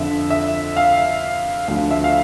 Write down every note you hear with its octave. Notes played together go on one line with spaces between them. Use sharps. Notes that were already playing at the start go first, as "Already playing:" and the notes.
Already playing: F2 D3 F3 E5
E5
F5
D2 D3 F3 F5
E5
F5